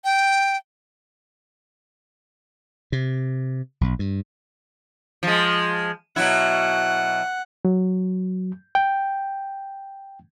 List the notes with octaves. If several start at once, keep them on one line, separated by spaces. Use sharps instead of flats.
G5
C3
B1
G2
F3 G#3
B2 F#3 E4 F#5
F#3
G5